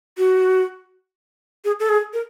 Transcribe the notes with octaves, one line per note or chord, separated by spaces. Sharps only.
F#4
G#4
A4
G#4
A#4